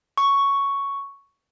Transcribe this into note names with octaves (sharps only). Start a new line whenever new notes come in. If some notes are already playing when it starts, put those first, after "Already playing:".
C#6